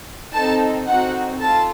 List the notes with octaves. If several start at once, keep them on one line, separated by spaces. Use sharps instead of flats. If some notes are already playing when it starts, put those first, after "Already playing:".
C4 D#4 A4 A5
C4 D#4 F#4 F#5
F4 A4 A5